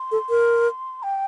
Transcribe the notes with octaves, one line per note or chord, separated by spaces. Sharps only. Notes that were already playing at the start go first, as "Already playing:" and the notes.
Already playing: C6
A4
A#4
G5